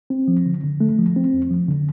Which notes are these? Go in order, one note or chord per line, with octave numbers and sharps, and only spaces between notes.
C4
F3
D3
D3
A3
F3
C4
F2
F3
D3